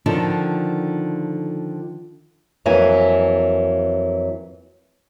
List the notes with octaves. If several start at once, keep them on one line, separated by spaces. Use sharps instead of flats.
D3 D#3 F3 D#4 A4
F2 E3 F#3 A#3 G#5